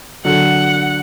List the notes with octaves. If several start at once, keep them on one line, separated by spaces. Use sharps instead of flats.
D3 F#3 F#5